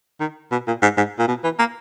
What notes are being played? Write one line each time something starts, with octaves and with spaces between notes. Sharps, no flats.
D#3
B2
A#2
G#2
G#2
A#2
B2
E3
A#3